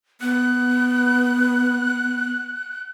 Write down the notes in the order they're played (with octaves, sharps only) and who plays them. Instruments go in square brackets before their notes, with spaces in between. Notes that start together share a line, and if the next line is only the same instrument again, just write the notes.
[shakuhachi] B3 [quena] F#6